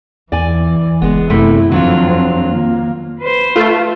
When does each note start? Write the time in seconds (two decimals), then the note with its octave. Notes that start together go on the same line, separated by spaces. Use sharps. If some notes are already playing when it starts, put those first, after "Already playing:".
0.32 E2 E3 D5 G#5
1.02 F#1 G#3 B3
1.30 F#2 C3 A3 E4
1.71 F2 D#3 F#3 C4 D4 F4
2.48 A#3
3.20 B4 C5
3.56 A3 F4